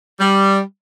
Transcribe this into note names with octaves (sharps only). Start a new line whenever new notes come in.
G3